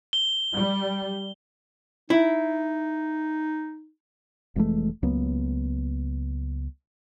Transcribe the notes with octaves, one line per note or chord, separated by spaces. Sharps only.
G7
G3
D#4 E4
F1 E3 G#3 A3
C#2 F#3 A#3 B3